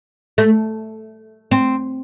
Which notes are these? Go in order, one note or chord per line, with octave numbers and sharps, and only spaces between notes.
A3
C4